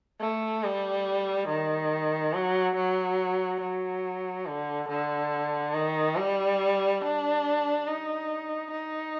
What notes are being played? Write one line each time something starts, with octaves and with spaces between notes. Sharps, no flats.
A3
G3
D#3
F#3
F#3
F#3
D3
D3
D#3
G3
D4
D#4
D#4